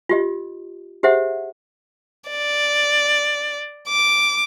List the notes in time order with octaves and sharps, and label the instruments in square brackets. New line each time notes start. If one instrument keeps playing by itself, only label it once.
[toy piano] F4 G4 D#5
G4 G#4 C5 E5 F#5
[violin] D5
D6